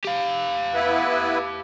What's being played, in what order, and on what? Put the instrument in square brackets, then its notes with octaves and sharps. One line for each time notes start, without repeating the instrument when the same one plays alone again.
[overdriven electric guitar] G4 F5
[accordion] B3 E4 B4